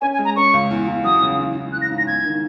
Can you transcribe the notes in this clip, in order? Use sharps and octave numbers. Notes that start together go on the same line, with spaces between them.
C#4 G#5
G#5
G#3
A#5
C#4 C#6
C#2
E2
E2
F#3 D#6
C#3
E3
E3
E3 F#6
A#6
G#2
A#6
E2 G#6
D#3